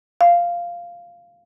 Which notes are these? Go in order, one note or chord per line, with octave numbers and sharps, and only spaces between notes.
F5